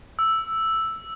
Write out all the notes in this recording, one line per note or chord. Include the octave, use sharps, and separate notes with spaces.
E6